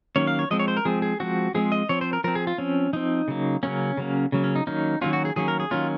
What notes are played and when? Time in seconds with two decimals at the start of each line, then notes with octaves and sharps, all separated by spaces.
0.16 D#3 F#3 A#3 C#4 C#5
0.27 F5
0.39 C#5
0.51 F3 G#3 C4 D#5
0.60 C#5
0.68 C5
0.77 A#4
0.85 F3 G#3 C4 G#4
1.02 G#4
1.20 F3 G#3 C4 F#4
1.55 F3 G#3 C4 G#4
1.72 D#5
1.89 F3 C4 C#5
2.01 C5
2.13 A#4
2.24 F3 C4 A#4
2.35 G#4
2.47 F4
2.58 F3 C4 C#4
2.93 F3 C4 D#4
3.28 C#3 F#3 A#3
3.63 C#3 F#3 A#3 C#4
3.97 C#3 F#3 A#3
4.32 C#3 F#3 A#3
4.44 C#4
4.56 D#4
4.67 D#3 F#3 A#3 C#4 D#4
5.01 D#3 F#3 A#3 C#4 F4
5.13 F#4
5.25 G#4
5.36 D#3 F#3 A#3 C#4 G#4
5.48 A#4
5.60 G#4
5.71 D#3 F#3 A#3 C#4 F4